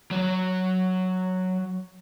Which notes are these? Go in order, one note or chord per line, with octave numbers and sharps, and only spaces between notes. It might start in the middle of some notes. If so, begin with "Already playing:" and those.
F#3 C#5